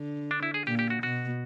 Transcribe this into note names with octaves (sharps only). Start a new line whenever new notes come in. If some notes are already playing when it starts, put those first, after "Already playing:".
Already playing: D3
D4
E4
G#4
A#2 G4
G4
F#4
B2 F#4